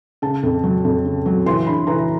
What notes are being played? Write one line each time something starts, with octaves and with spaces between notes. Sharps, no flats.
C#3 A5
F2
F#3
F2
C#3
F#3
E3 C6
G2 B5
E3 A#5